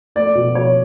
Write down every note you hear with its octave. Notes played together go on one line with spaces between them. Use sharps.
A3 D5
B2
B2 C#5